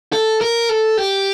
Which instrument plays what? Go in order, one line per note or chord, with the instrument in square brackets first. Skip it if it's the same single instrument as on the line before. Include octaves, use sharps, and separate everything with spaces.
[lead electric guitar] A4
A#4
A4
G4